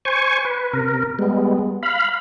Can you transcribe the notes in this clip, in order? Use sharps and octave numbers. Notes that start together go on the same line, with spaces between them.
C5 G#5 C#6
B4
C3 A#4
G3 G#3 B3
F5 B5